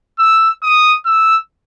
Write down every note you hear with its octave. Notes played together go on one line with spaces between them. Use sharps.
E6
D#6
E6